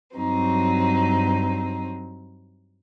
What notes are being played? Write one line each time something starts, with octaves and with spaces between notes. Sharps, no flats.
G2 F#3 C4 D#4